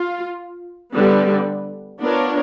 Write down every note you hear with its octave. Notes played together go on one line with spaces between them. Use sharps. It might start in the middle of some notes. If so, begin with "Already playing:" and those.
Already playing: F4
D3 G3 B3
B3 D4 F4 A#4 C#5